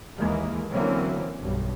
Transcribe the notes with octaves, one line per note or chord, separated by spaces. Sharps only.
D#2 E3 G#3 A#3
D3 E3 F#3 A#3 C4 C#4
B1 G2